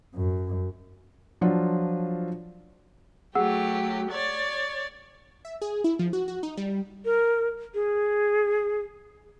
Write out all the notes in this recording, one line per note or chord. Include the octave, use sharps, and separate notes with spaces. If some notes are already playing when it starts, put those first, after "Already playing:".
F#2
F3 F#3 D4 F4
F#3 A3 G4 G#4 F#5 E6
C#5 D5 A6
E5
G#4
E4
F3
F#4
F#4
D#4
G3
A#4
G#4